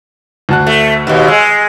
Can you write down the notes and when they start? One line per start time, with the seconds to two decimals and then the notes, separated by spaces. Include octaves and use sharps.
0.49 D2 A5 F#6
0.67 A3
1.07 D#2 B2
1.28 G#3 E6